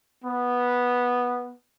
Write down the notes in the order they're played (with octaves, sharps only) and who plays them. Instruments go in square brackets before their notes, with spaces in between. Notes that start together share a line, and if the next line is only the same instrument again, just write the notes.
[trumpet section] B3